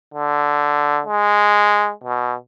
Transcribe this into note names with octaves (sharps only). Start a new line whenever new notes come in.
D3
G#3
B2